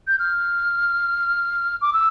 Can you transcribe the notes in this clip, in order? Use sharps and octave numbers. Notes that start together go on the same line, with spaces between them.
G6
F6
D6
E6